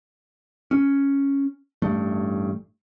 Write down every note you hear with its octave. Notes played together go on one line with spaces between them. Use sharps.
C#4
A1 G2 A3